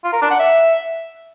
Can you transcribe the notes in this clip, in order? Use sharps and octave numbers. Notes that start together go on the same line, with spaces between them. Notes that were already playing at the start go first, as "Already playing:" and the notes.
F4
A#4
D4
F#5
E5